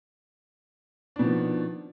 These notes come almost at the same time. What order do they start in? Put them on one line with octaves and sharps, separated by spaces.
D4 B2 F3 D#3